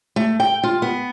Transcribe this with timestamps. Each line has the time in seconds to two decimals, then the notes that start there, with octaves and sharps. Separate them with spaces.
0.16 A3
0.40 G5
0.63 F4
0.82 B3